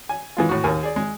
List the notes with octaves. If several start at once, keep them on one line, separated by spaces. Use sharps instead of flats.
G#5
E3 G#3 F4
A2 F#4
D#2 A#4 G#5
G#4 D5
G#3